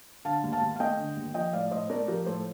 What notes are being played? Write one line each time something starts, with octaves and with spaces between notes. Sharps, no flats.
D3 F5 A5
D#2
F5 A5
D#2
F5
A3 D#5 G5
D3
D#2
F3 D#5 G5
A2 D5 F5
A2 C5 D#5
A3 A#4 D5
F3 G4 A#4
A2 A4 C5